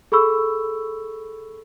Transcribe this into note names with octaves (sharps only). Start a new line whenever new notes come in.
G#4 A4 B5 C#6 E6